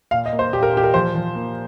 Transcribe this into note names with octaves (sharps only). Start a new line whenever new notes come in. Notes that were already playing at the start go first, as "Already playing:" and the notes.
A#2 F5
D#5
A#3
C5
A#2 G4
A#4
A#2 G4
A#4
F3 C5
F3
A#3